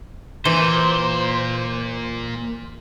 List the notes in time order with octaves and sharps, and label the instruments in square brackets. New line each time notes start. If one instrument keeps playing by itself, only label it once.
[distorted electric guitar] A#2 [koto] E3 [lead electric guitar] C5